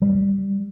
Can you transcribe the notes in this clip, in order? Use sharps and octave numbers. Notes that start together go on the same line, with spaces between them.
G3